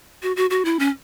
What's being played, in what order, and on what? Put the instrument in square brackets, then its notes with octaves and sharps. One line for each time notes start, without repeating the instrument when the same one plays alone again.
[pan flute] F#4
F#4
F#4
E4
C#4